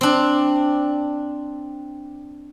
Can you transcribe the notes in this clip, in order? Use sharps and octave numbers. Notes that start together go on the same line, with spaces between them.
C4 D4